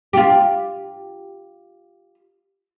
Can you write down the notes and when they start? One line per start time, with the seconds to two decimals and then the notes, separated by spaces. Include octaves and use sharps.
0.13 F4 G4